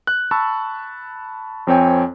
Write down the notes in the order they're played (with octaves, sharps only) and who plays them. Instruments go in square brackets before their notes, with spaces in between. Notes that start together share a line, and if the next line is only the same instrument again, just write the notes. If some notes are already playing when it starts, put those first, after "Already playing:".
[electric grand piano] F#6
A5 B5 C#6 E6
F2 C4 C#5 G5 G#5